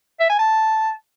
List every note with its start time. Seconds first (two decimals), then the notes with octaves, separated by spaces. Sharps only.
0.20 E5
0.30 G#5
0.39 A5